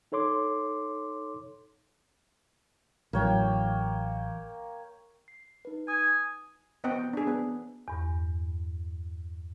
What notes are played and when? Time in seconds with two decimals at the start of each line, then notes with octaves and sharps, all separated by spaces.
0.12 D#4 A4 C#5 C6 D6
3.13 A1 F#3 A#3 C#5 G5
5.28 C7
5.65 D#4 B4
5.88 G#5 D#6
6.84 B3 C4 D#5 F#5 G5
7.13 D4 G#4
7.27 B3
7.88 E2 G2